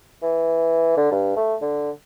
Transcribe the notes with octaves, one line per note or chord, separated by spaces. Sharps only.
E3
D3
G2
A3
D3